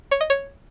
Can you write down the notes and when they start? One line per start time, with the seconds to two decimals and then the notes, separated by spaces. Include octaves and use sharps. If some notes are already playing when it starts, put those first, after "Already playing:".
0.11 C#5
0.21 D#5
0.30 C#5